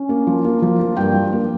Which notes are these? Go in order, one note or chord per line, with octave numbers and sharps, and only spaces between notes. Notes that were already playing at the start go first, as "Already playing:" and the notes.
Already playing: C#4
A#3
F3
A#3
F3
A#3
G2 G5
F3
A#3